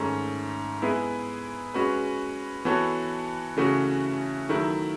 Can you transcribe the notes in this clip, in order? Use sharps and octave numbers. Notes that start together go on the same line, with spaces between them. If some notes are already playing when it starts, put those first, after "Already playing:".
Already playing: G#2 D#3 A3 C#4
G#3 B3 E4 G#4 B4
G#3 C#4 F#4 B4
E3 B3 F#4 A4 C#5
C#3 E3 A3 C#4 F#4
D#3 F#3 A3 E4